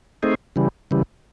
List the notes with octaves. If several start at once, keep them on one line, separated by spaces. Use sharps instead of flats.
A3 C4 D#4 G#4
C#3 E3 G3
C#3 E3 G3